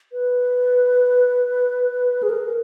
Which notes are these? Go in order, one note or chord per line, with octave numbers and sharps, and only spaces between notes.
B4
G#4
A#4